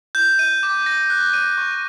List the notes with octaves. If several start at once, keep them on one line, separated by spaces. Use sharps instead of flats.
G6
D#7
D6
A#6
F#6
D#7
C#6